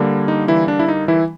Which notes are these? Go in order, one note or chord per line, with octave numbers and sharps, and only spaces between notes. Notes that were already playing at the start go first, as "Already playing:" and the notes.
Already playing: D3 G3 A#3
D#4
E3 E4
D4
E4
D#4
E3 E4